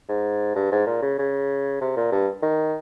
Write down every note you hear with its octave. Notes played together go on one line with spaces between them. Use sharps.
G#2
G2
G#2
A#2
C#3
C#3
C3
A#2
G2
D#3